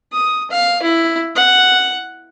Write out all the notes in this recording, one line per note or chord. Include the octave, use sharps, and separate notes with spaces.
D#6
F5
E4
F#5